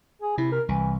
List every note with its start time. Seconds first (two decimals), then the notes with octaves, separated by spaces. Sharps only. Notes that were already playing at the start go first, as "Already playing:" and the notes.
0.22 G#4
0.38 C3 E4
0.52 A#4
0.69 C2 E3